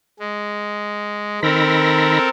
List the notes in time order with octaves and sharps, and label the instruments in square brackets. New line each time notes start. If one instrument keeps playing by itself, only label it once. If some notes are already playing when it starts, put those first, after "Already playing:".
[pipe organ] G#3
[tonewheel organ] D#3 B5 A#6 [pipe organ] C4 A4 A#4